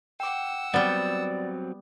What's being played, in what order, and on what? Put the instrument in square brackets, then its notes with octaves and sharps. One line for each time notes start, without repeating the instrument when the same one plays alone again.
[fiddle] F#5 E6 [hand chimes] G5 D6
[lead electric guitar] F#3 C4 [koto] G3 B3 [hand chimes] D5 A6